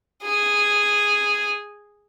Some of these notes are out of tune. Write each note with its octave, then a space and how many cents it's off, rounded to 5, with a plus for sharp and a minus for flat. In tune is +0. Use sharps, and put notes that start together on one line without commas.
G#4 -5